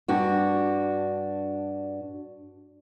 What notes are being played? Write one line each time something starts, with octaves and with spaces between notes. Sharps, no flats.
G2 D4 F#4